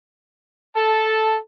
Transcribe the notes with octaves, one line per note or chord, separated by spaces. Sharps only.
A4 A5